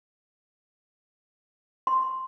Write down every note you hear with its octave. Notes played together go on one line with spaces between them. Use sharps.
C6